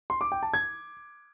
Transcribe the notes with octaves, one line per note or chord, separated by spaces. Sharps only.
C6
D6
G5
A5
G#6